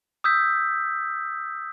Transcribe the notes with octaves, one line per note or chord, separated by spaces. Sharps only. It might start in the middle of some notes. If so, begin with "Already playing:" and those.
D#6 E6 G6 B6